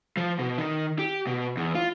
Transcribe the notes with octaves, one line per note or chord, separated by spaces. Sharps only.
F3
B2
D#3
G4
B2
E2
F4